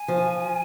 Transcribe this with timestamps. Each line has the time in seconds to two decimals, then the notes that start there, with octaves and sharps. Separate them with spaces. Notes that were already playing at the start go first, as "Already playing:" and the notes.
Already playing: G#5
0.08 F3